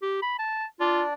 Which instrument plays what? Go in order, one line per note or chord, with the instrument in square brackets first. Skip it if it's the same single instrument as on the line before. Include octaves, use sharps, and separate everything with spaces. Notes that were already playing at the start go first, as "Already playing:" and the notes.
[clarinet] G4
B5
A5
[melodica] D4 D5 [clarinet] F4